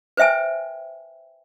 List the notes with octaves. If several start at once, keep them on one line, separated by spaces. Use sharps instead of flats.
B4 C5 E5 G5 G#5